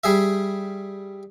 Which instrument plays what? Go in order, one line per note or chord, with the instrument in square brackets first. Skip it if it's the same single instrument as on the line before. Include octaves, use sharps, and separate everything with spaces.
[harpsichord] G3 G#4 E5